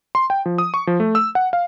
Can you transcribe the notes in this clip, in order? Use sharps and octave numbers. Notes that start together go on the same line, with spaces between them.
C6
G5
F3
D#6
C#6
F3
A3
E6
F#5
F5